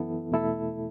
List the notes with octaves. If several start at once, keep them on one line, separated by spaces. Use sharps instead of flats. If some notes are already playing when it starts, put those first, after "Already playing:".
Already playing: F#2 E3 B3 E4 A4
E2 B2 A3 E4 A4